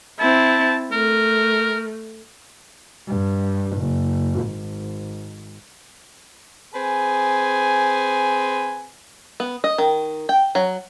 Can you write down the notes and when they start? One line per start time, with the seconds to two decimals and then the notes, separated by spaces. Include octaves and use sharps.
0.20 C4 E4 A5
0.92 A3 A#4
3.07 G2
3.77 F#1
4.40 G#1
6.74 C4 G#4 B4 G#5
9.40 B3
9.64 D#5
9.78 D#3
10.29 G5
10.55 F#3